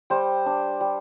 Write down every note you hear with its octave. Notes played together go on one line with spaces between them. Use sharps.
G3 C5
D4
G3